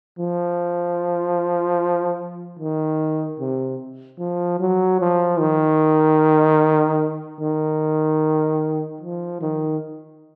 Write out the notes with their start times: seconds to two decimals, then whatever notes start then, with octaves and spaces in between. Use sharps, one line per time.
0.19 F3
2.59 D#3
3.40 C3
4.19 F3
4.60 F#3
5.00 F3
5.39 D#3
7.41 D#3
9.01 F3
9.41 D#3